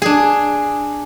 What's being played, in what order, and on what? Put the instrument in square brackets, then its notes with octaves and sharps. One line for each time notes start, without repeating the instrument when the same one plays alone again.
[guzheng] D4 G#4